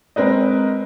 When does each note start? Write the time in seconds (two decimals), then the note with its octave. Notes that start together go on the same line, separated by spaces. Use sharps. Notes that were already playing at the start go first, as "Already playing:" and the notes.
0.16 G#3 C4 A#4 B4 D#5